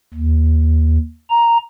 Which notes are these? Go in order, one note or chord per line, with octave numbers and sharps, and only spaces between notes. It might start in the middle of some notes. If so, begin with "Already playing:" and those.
D#2
A#5